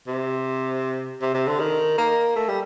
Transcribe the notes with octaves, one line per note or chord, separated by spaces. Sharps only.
C3
C3
C3
D3
D#3
A#3
A3
G3